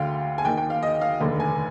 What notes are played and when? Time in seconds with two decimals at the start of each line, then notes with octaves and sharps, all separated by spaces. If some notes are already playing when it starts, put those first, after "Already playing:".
Already playing: D2 D3 F5 G5
0.38 G#5
0.45 D#2 D#3 G5
0.57 G5
0.70 F5
0.83 D#5
1.01 F5
1.21 F1 D#2 D3
1.40 G#5